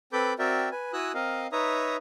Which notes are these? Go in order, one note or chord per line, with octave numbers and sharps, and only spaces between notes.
C4 A4 B4 B5 D6 G6
C4 F#4 A#4 D5 E5 G5
B4 G#5
E4 F#4 G#5 D#6 E6 F#6
C4 A#4 D#5 F5
D#4 B4 C#5 E5 A#5 D#6